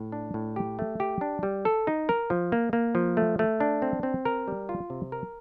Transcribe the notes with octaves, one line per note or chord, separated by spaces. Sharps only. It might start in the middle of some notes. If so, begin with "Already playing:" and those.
Already playing: A2
D4
A2
G4
A3
G4
D4
G3
A4
D#4
A#4
F3
A#3
A#3
F3
A3
A3
D4
C4
C4
A#4
G3
F4
C3
A#4